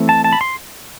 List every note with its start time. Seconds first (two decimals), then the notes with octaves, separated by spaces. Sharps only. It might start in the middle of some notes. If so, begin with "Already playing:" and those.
Already playing: E3 A3 C4
0.09 A5
0.24 A5
0.33 B5
0.41 C6